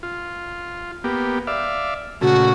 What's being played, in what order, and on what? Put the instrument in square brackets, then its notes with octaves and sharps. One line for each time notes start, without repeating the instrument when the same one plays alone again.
[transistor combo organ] F4
A#3 B3 G4
D5 E5 F5
[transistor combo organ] A#2 C#3 A3 [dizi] F#4